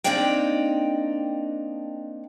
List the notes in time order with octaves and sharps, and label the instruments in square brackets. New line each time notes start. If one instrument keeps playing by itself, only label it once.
[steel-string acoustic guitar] A#3 C4 D4 D#4 D5 G5